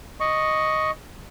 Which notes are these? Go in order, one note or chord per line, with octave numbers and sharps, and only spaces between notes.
D#5 C#6